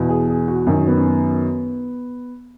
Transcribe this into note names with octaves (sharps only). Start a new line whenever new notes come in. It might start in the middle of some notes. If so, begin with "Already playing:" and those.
Already playing: E2 B2
G#4
G#4
F#4
F#2 D#3 C#4
B3
C#4
B3